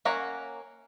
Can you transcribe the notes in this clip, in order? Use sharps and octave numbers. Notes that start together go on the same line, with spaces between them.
A#3 C#4 C#5 F#5 A#5